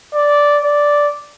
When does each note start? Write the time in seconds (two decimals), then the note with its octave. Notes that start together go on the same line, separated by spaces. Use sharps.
0.15 D5
0.64 D5